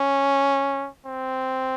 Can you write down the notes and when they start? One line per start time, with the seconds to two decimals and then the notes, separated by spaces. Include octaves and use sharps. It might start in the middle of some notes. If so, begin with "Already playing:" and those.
Already playing: C#4
1.06 C4